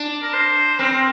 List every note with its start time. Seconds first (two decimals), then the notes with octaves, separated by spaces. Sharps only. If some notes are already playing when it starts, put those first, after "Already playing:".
Already playing: D4
0.22 A#4
0.33 C5
0.79 C4 A#4